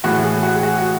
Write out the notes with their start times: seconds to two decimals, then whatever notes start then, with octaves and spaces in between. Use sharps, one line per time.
0.04 A2 E3 G#3 F#4
0.24 G#4
0.43 F#4
0.55 G#4
0.63 F#4
0.78 F#4